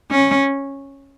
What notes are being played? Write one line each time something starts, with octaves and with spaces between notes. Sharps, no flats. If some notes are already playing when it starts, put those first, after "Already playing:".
C#4